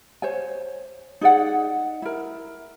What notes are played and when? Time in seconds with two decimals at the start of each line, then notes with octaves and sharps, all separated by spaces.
0.22 C5 C#5 G#5
1.21 D#4 G#4 D5 F#5
2.02 E4 A#4